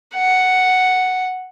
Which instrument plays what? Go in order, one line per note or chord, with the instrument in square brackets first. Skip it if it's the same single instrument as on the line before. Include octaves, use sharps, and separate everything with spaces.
[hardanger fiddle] F#5